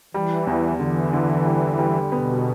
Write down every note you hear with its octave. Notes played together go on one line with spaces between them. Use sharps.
E3 G3
E2
D3 E3
D3
G3
G3
B2 B3